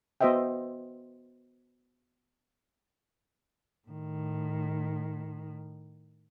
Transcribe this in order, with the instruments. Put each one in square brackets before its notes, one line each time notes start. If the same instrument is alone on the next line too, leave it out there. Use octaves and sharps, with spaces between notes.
[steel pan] B3 F#4 C5 D#5 E5 G5
[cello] A2 D#3